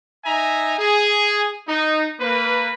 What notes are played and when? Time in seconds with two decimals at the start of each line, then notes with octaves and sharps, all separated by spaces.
0.24 D#4 E5 G#5 A#5
0.78 G#4
1.67 D#4
2.20 A#3 B4